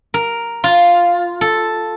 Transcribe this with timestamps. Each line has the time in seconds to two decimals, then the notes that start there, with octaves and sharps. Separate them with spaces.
0.14 A#4
0.64 F4
1.41 A4